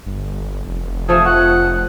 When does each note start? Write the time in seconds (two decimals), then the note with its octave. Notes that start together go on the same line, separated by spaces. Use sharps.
0.06 G1
0.63 F1
1.09 F3 A3 G#4
1.25 F#5